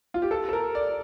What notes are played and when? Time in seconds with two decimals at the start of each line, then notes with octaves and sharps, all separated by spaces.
0.14 F4
0.22 G4
0.31 A4
0.49 A4
0.53 A#4
0.75 D5